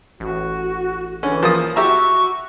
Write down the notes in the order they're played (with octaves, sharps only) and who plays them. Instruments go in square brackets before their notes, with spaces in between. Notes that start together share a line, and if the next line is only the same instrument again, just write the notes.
[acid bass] A1 [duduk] F#4
[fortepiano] D3 C#4 [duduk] E3
[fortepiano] F3 A#3 D#6
[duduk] F#4 [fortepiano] G4 E5 A#5 [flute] C#6